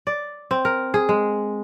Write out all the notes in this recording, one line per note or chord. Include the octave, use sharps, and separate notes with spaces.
D5
C4
A#4
G#4
G#3